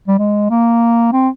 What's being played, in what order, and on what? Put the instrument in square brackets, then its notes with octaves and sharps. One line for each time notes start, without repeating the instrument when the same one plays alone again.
[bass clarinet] G3
G#3
A#3
C4